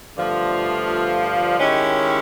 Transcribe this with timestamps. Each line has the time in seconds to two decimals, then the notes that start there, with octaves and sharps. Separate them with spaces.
0.16 G2 D3 F3 A3
1.58 D#3 G#3 C#4 E4 G4